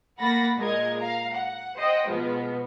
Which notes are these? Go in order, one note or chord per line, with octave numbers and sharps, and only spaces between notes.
A#3 F#5 B5 A6 A#6
A#2 G#3 A#4 D#5 G#6
F5 A#5
F#5
C5 D#5 F#5 G5
B2 F3 G#3 B3